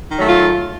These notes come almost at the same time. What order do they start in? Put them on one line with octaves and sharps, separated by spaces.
D#3 F#3 A3 F4